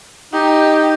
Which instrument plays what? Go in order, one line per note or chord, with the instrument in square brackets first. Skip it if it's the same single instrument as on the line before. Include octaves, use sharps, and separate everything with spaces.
[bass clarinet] D#4 [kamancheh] G4